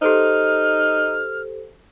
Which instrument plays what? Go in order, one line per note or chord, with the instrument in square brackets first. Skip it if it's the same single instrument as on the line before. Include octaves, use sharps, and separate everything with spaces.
[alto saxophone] D#4 [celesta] G4 A4 C5 [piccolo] F6